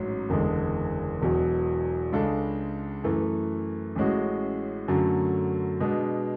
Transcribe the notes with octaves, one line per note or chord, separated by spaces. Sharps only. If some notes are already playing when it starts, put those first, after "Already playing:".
Already playing: A1 G#2 F#3 C#4
F#1 E2 D3 G#3
E1 E2 B2 F#3
C#2 C#3 G#3 D4 A4
F#2 E3 A3
A1 A2 G#3 C#4 F#4
F#2 D3 F#3 A3
B2 G#3 B3 D4